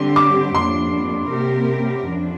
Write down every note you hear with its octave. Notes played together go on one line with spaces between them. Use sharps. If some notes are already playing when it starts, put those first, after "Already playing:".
Already playing: D3 G3 C4 G4 C6
D6
F2 F3 A#3 D4 C6
C3 A#3 G4 A#4
F2 F3 D4